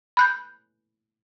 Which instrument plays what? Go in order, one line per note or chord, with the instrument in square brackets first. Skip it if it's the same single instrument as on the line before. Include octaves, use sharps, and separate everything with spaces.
[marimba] B5 F#6 G6